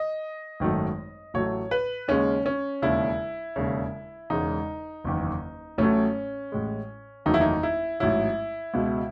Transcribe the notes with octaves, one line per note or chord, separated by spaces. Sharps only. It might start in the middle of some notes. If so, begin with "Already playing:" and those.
Already playing: D#5
G#1 F#2 D#3 F#3 A3
A1 A2 F#3 A3 C#5
B4
D#2 C#3 G#3 C#4
C#4
E1 D#2 C#3 E4
E1 D#2 C#3
E1 E2 C#3 G#3 D#4
F#1 E2 D#3
A1 A2 F#3 A3 C#4
A1 A2 G#3
F#1 E2 D#3 F#3 A3 D#4
E4
D#4
E4
A1 G#2 F#3 E4
C#2 B2 G#3